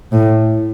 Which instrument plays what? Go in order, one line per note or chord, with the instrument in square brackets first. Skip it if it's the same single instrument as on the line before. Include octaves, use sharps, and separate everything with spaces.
[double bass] A2